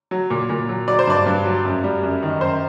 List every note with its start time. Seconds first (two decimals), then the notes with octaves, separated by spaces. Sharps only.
0.11 F#3
0.30 A#2
0.49 A#2
0.69 F#3
0.88 F#3 D5
0.99 C5
1.07 G2 D5
1.26 G2
1.45 F#3
1.65 F#2
1.84 G3
2.03 F#2
2.22 D#3
2.41 F#2 C5